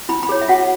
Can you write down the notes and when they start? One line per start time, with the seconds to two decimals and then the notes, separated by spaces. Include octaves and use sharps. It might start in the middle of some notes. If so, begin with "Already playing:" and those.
0.09 E4 B5
0.23 B5
0.29 G#4 C#5
0.42 E5
0.48 F#4 F#5